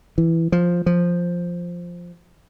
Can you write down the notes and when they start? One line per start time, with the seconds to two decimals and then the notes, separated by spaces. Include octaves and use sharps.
0.18 E3
0.52 F3
0.86 F3